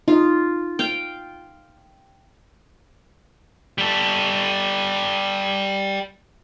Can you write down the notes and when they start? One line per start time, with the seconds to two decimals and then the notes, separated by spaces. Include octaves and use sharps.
0.08 D#4 F4
0.79 F5 G5
3.78 G3 A4